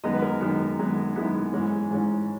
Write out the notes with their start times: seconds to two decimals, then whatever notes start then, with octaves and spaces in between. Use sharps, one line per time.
0.04 F#2 D#3 G#3 B3 D#5
0.14 B4
0.22 A#4
0.41 F#2 D#3 G#3 B3
0.79 F#2 D#3 G#3 B3
1.16 F#2 D#3 G#3 B3 E4
1.53 G#2 E3 G#3 C#4
1.91 G#2 E3 G#3 C#4